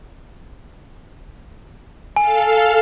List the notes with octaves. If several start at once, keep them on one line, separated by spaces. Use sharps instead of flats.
A4 F5 G#5